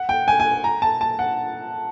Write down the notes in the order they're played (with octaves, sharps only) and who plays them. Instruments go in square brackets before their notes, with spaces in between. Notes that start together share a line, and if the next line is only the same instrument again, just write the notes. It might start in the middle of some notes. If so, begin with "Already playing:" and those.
Already playing: [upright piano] F#5
G5
G#5
G#5
A#5
A5
A5
F#5